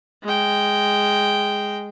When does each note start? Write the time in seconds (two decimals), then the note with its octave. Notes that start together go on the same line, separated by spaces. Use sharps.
0.23 G#3 G5